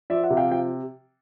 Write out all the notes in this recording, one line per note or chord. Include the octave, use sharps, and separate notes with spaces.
F3 D5 E5
E5 F#5
C3
F5 G5
F3 F5 G5